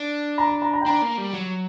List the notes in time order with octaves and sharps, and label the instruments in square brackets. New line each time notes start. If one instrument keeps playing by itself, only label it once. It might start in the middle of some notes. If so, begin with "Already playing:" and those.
Already playing: [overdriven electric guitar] D4
[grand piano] A#5
B5
A#5
A#5
G5
[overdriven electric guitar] D4 [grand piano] A#5
[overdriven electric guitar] A#3
G3
F#3